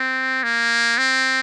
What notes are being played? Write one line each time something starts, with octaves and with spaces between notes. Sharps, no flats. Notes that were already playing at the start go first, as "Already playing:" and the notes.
Already playing: C4
A#3
C4